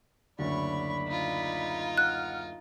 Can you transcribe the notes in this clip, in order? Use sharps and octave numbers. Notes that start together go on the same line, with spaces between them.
F#1 D2 D3 C#5 D5 B5 C#6
D#4 F4
F#5 F6 F#6